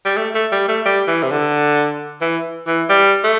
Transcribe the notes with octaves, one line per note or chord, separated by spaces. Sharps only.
G3
A3
A3
G3
A3
G3
E3
C3
D3
E3
E3
G3
A3